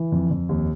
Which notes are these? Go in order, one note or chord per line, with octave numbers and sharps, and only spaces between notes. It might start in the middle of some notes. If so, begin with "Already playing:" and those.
Already playing: E3
F2
F2
D#2